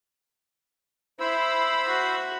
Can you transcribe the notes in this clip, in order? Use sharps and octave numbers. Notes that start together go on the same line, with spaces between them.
E4 C5 B5 E6
F#4